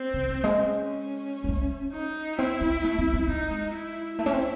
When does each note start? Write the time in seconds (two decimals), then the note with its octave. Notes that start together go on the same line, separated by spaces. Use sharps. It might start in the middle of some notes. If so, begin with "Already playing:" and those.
Already playing: C4
0.14 C#3
0.29 D#3
0.44 G#3
0.59 C#4
1.44 G#3
1.49 A3
1.93 D#4
2.39 C4 E4
2.61 C4
2.84 A3
2.99 C4
3.13 C4
3.28 A3 D#4
3.51 G#3
3.73 E4
4.19 A3 E4
4.26 C#4
4.33 C4